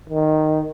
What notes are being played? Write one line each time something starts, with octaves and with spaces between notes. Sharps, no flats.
D#3